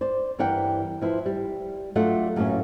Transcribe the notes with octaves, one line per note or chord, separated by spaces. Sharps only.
C5 D5
G2 E3 A#4 D5 F#5 G5
F3 E4 B4 C5
G3
F#3 A3 D4 F4 D5 F#5
F#2 A2 E3 A#3 C4 C#4